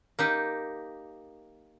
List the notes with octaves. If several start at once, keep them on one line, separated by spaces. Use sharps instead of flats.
A#3 D#4 G4